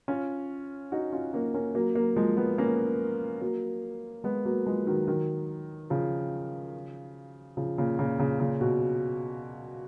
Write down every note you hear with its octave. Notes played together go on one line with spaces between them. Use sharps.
C#4 F4
D#4 F#4
C#4 F4
A#3 C#4
A#3 C#4
F#3 A#3
F#3 A#3
F3 G#3
G#3 B3
A#3 C#4
F#3 A#3
G#3 B3
F#3 A#3
F3 G#3
D#3 F#3
D#3 F#3
C#3 F3
C#3 F3
A#2 C#3
A#2 C#3
A#2 C#3
A#2 C#3
B2